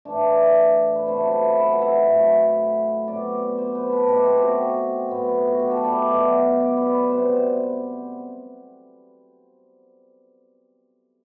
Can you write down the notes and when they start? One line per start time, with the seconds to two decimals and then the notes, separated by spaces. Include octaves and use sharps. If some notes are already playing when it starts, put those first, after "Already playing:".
0.05 A2 E3 A3 D4
0.95 B4
1.06 C3 F#3 A3 C5
1.19 A4
1.32 B4
1.44 B4
1.57 B4
1.73 F#5
1.82 E5
2.07 A2 F#3 A3
3.08 C3 F#3 B3 D5
3.58 C5
3.75 B4
3.92 A4
4.08 B2 A3 G4
4.25 C4
4.37 F#4 G4
5.09 A2 F#3 B3
5.48 F#4
5.59 G4
5.71 A4
5.76 B4
5.84 D5
5.92 E5
6.10 B2 F#3 B3
6.60 D5
6.77 B4
6.94 B4
7.10 C3 G3 B3 C5